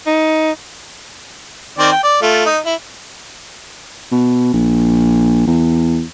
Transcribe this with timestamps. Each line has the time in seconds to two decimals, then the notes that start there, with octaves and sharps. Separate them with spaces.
0.06 D#4
1.79 D#3 C4 D5
1.92 G5
2.04 D5
2.22 A3 F4
2.45 D#4
2.66 E4
4.12 B2
4.54 A#1
5.48 E2